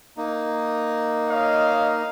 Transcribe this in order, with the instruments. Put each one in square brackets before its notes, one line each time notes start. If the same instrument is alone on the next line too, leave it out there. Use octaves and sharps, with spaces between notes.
[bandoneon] A#3 D#4
[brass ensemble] C#5 D#5 F5